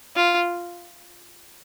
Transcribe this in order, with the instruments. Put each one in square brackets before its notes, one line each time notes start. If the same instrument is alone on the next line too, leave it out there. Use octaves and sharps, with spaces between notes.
[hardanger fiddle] F4